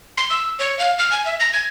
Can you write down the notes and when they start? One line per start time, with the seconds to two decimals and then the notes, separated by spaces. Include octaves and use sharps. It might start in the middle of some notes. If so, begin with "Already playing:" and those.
0.17 C6
0.30 E6
0.59 C#5
0.79 F5
0.99 F6
1.12 G#5
1.25 E5
1.40 A#6
1.53 G#6